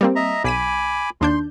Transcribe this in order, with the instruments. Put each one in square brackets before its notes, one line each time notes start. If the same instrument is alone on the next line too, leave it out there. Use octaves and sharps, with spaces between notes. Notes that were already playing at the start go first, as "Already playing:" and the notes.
[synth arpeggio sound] G3 A#3 C4
[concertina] D#5 E5 A#5
[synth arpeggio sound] B1 B6 D#7 [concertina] G#5 B5 D6
[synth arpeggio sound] D#2 D4 G6 [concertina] C6